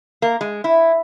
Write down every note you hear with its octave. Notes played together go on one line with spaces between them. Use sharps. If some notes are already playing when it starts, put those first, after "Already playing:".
A#3
G#3
E4